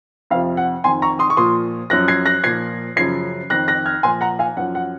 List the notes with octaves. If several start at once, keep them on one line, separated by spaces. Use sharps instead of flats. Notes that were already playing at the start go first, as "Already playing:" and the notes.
F2 C3 F3 F5
F#5
F2 D#3 G#5 C6
A#5 C#6
C6 D#6
C#6
A#2 F3 C6 D#6
F#2 F3 F#6 A#6
G#6 C7
F#6 A#6
A#2 F3 G#6 C7
F#2 C#3 F3 G#6 C7
F2 D#3 F#6 A#6
F#6 A#6
F6 G#6
A#2 F3 G#5 C6
F#5 A#5
F5 G#5
F#2 F3 F#5
F#5